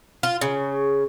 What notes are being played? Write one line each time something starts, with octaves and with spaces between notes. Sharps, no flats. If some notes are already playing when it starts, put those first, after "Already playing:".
F4
C#3